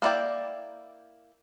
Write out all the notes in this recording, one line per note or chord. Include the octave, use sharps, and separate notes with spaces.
A#3 B3 E4 D5 G5